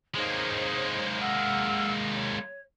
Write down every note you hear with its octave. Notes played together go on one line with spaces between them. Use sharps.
G#3 A#3 D#4 C5 C#5
F#5 E6 F6
C#5